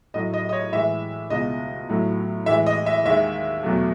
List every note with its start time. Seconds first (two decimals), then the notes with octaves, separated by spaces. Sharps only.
0.14 A2 F#3 A3 D#5
0.34 D#5
0.49 D#5
0.52 C#5
0.72 A2 E3 G#3 E5
1.30 C#2 B2 G#3 D#5
1.89 A2 F#3 A3
2.46 A2 E3 G#3 E5
2.66 D#5
2.86 E5
3.05 D#2 D#3 G#3 E5
3.63 E2 B2 F#3 A3